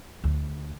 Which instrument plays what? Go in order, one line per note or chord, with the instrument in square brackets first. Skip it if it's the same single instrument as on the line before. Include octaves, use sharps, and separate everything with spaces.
[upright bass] D2